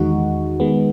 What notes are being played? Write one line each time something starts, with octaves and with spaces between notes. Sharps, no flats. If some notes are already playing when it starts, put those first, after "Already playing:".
Already playing: E2 D#3 G#3 D#4 F#4
D#3 G#3 B3